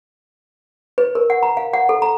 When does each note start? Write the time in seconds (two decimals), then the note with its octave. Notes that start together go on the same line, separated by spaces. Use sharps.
0.98 B4
1.15 A#4
1.30 F#5
1.43 A#5
1.57 F5
1.74 F#5
1.89 A4
2.02 A#5